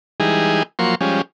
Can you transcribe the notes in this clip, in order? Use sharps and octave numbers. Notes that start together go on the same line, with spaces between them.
E3 G3 G#3 D#4 G#4
F3 F#3 A#3 C6 C#6
F3 G3 G#3 C#4